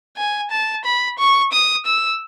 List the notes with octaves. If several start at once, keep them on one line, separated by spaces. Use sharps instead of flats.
G#5
A5
B5
C#6
D#6
E6